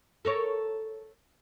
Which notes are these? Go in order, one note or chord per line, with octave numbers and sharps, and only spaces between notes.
A4 A#4 C#5